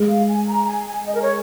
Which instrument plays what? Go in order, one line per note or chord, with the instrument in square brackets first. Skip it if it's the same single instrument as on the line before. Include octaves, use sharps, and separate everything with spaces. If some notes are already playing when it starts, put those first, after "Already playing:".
Already playing: [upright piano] G#3
[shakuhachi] F5
G#5
A#5
G#5
G#5
D#5
A#4
C#5